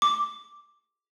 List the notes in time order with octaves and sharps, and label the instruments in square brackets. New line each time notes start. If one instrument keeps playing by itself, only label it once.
[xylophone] D6